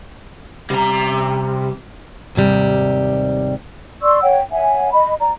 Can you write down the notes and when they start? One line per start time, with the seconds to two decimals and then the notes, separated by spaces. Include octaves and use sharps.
0.70 C3 G3 A#5
2.35 D#2 G#2 C3 G3
4.02 D5 C6 C#6 E6
4.22 C#5 F#5 G5
4.51 C#5 E5 F#5 G#5
4.92 D#5 B5
5.20 D5 A#5